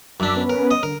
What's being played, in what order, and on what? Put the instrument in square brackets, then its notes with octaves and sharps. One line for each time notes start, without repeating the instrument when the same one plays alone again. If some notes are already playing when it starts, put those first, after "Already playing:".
[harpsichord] F#2 D4 [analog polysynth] D6 E6 B6
[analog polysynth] B3 C#4 B4
[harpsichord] A#4
D#5
[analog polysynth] D3 [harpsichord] A#4